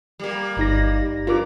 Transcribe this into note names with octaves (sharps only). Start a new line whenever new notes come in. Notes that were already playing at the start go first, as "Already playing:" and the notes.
G3 A#3
G1 D#4 A#6
G2 F4 A#4 D6